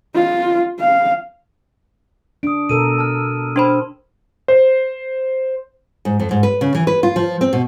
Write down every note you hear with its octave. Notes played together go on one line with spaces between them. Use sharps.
F4
F5
D4 D#6 D7
B2 A4 A#4 E6 D#7
A5 F6
D4 C5 B5 C6
C5
G#2
F2
G#2
B4
C#3
E3
B4
F4
F3
C4
B2